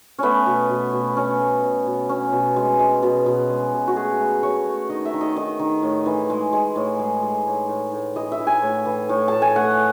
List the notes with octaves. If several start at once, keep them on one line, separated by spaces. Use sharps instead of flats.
A3 B3 C#4
B2
B2
B2
B3
B2 C#4
A3
B2
B2
B2 C#4
B2
G#3
G#3
B2
B2
G#3
B2
F#4
A3 G#4
A3
A3 C#5
A3
D#3 D#5
E5
D#3
D#5
D#3 D#5
D#3
A2
E3
G#3
G#3
A2
G#3
G#3
A2
A2
A2
E3 D#5
E5
E3
G#5
A2
E3
A2
A2 A5
G#5
A3 F#5